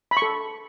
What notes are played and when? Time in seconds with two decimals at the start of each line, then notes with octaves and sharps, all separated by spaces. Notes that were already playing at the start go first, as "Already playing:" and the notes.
0.11 B5
0.17 C#6
0.22 A4